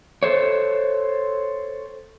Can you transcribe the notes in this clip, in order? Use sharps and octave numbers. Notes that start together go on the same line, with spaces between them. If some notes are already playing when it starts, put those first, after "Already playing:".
A4 C5 C#5